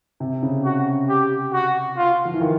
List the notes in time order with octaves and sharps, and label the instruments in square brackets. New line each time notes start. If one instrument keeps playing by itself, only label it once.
[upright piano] C3
C#3
[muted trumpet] F#4
G4
F#4
F4
[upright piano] F3
E3
D#3